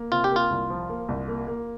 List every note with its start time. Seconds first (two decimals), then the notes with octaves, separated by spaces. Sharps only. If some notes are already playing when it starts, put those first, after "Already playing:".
Already playing: A#3
0.12 C3 F4
0.24 G4
0.31 A#3 F4
0.51 C2
0.70 F3
0.89 A#3
1.08 C2
1.28 A#3
1.47 A#3